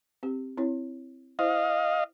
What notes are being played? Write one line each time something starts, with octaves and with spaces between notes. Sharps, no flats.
C4 G4
C4 E4 C#5
E4 C5 D#5 F5